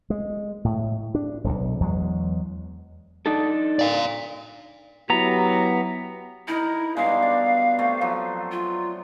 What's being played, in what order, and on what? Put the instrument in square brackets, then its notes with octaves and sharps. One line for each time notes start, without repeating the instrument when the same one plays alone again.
[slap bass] G#3
A2
D4
D#1 B1
E2 F#3 G#3
[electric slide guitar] D4 D#4 A4
[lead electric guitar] D5 F5
[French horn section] F#3 E4 G4 [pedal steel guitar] B3 A#5
[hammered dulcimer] D#4 A#4 A#5 [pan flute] E4
[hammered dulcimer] G2 B2 G#3 [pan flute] F5
[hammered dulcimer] D4
C3 A3
F3 F#3
[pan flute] F4